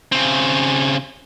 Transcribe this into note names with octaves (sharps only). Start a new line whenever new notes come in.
C#3 C4